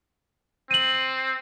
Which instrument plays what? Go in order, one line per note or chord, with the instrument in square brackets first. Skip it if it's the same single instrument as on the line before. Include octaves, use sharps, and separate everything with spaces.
[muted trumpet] C4 [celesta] D#7 F#7